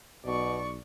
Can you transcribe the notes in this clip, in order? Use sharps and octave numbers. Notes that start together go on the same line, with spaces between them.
B1 B2 D5 C#6